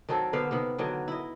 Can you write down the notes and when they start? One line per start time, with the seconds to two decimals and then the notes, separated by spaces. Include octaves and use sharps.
0.09 D#3 F#3 C4 A4
0.33 D3 B3 C5 F5
0.51 C3 D#3 B3
0.78 D3 D#3 F#3
1.08 E4 D#5